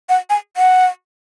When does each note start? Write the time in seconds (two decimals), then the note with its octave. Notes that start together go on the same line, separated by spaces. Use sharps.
0.09 F#5
0.30 G#5
0.57 F#5